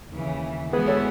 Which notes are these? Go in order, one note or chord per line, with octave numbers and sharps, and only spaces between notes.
D#2 C#3 E3
E3 G#3 B3 F#4 G#4 B4
A4 C#5